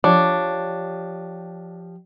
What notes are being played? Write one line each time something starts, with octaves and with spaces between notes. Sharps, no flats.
F3 D4 G4 C#5